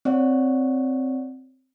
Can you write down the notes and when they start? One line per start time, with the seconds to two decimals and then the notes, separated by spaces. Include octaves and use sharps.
0.05 C4 C#5 D5 F#5